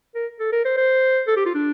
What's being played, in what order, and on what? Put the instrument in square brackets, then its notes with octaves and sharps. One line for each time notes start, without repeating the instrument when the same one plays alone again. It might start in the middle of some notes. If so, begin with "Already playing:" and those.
[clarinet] A#4
A4
A#4
C5
C5
A4
G4
F4
D4